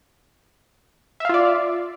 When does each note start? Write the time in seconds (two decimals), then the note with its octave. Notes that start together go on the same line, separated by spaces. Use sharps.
1.20 E5
1.25 F5
1.29 F4
1.34 D5